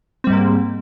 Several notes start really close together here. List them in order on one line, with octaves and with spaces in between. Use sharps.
C4 G3 G#2 A#3